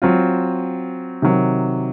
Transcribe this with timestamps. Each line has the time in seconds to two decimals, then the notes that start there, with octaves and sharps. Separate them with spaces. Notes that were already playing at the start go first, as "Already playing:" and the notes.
0.02 F#3 C4 F4
1.22 C3 D#3 F#3